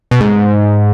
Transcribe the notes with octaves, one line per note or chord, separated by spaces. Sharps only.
B2
G#2